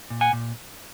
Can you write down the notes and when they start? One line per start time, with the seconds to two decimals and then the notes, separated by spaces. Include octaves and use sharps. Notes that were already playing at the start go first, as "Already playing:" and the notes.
0.10 A#2
0.21 F#5 G#5
0.33 A#2